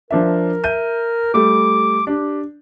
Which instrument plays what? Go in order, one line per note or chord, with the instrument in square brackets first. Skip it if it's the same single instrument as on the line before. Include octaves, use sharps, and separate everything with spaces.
[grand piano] F3 D4 E5 [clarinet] A#4
[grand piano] E5 G6 D#7
[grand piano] G3 A3 [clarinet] D6
[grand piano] D4 [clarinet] G4